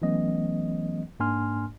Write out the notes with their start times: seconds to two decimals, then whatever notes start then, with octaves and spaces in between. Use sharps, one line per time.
0.02 E3 F#3 A3 B3 C#4 D#5
1.20 G#2 A#3 D4 G#5 C6 F6